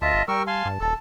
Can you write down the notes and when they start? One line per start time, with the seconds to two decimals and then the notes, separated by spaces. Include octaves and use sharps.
0.02 D2 F4 D#5 E5 A5
0.14 G1
0.28 G3 A#4 G5 C#6 E6
0.47 F5 G#5 A5 C6
0.65 G2
0.80 D#1 A4